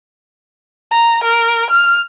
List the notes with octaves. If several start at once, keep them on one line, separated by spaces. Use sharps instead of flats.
A#5
A#4
F6